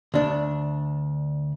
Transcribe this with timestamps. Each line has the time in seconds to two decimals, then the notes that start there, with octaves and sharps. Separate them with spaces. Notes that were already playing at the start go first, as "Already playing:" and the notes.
0.14 D2 D4